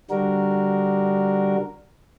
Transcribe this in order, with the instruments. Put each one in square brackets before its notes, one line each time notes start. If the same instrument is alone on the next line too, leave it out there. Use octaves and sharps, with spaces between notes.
[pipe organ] D3 G3 D4 F#4 A#4